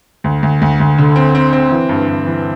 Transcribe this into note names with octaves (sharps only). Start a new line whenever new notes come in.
D2
D2
D2
D2
D3
C4
C4
C4
E3
G2
G2
E3